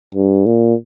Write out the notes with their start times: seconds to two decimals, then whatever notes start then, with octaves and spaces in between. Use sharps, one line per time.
0.15 G2
0.46 A#2